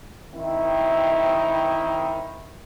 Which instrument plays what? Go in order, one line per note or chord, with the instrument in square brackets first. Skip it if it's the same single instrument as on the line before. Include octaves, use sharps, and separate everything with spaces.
[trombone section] D#3 C4 E4